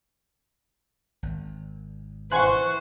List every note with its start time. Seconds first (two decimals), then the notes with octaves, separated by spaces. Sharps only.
1.23 G#1
2.32 E3 C5 F#5 G#5 C6 C#6 F#6